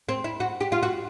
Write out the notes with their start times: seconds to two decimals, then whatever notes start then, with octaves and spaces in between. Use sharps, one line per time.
0.09 C4
0.24 E4
0.40 F#4
0.61 G4
0.72 F4
0.83 F#4